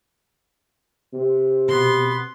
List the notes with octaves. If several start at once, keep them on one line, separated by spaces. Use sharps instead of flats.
C3
B2 B3 C6